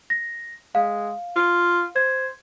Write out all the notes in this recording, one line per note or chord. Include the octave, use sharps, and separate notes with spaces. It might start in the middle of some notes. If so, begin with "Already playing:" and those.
A#6
G#3 F5
F4
C5 G#6